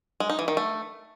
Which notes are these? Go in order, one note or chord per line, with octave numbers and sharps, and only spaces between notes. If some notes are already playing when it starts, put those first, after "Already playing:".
G#3
D#4
E3
D#3
A3